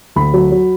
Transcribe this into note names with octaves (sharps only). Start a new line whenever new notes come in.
D2 B5
F#3
F#3